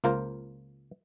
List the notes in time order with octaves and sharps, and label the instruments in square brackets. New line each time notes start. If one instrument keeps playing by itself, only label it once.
[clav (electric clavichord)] C#2 A#3 F4 A#4 C5